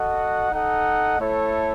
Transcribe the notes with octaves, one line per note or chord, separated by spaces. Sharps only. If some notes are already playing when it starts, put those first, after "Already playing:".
Already playing: F#4 A4 D#5 F#5
D#4 A4 D#5 F#5
A3 E4 A4 C#5